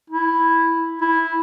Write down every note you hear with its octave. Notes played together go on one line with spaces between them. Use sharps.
E4
E4